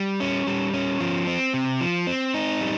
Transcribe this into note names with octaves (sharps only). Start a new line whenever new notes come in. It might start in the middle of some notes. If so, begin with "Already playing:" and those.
Already playing: G3
C#4
G3
C#4
F3
C4
C3
F3
C4
D#4
G3